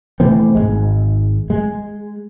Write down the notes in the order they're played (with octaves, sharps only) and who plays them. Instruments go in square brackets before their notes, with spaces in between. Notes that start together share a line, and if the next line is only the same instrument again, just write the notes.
[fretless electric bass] B2 E3 A3 C4
G#1 D#2 G#3
G#3